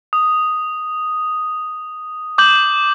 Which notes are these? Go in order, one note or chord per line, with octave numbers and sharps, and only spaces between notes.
D#6
D6 G6 F#7